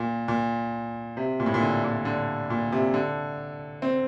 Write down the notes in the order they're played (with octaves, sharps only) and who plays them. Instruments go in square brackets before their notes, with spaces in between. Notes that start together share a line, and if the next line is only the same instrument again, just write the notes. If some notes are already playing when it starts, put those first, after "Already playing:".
Already playing: [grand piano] A#2
A#2
C3
A#2
A2
A#2
D3
A#2
D3
A#2
C3
D3
C4